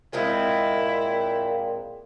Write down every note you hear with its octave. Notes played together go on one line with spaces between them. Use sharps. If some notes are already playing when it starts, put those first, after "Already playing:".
A#2 G#3 C4 E4 F4